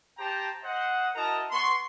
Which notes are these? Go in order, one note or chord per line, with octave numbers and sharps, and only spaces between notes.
G4 C5 G5 A5 A#5
C5 D#5 F#5
E4 F#4 A#4 D#5 A5 A#5
B3 C6 C#6